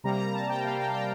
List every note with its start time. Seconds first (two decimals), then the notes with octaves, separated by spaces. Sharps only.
0.04 C3 G3 A#3 A#5
0.18 A#5
0.34 A5
0.49 G5
0.64 C3 G3 A#3 F5
0.79 G5
0.88 F5
0.94 G5